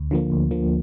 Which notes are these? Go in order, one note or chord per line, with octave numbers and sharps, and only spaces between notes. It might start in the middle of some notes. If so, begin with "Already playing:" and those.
Already playing: D2
D3 F3 A#3
D2
D3 F3 A#3